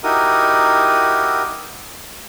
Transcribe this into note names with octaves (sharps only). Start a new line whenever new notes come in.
D#4 E4 F#4 G4 A#4 D#6